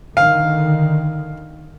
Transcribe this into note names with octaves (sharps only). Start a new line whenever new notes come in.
D3 D#3 F5